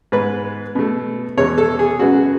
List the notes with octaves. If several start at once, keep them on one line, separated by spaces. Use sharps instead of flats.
G#2 G#3 B3 B4
B2 A3
E2 B2 G#3 B3 C#5
A4
G#4
F#2 C#3 G#3 B3 F#4